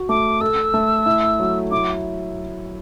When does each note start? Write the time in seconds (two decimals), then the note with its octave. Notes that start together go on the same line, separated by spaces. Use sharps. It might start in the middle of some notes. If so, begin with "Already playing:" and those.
Already playing: F#4
0.09 A3 D6
0.41 A4 E6
0.74 A3
1.06 E4
1.40 F#3
1.71 E4 D6